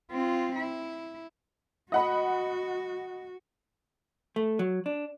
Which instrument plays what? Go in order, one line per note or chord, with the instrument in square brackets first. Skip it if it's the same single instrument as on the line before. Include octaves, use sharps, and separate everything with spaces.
[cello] C4 F4
E4
[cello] F#4 [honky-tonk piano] D#5 F#5 B5
[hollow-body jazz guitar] A3
F#3
D4